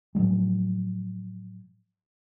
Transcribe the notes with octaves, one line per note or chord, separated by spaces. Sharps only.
A2 F3 F#3 G#3